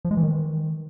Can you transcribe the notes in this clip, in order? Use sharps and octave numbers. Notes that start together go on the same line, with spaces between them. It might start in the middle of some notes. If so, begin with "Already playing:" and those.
F3
G#3
E3
D#3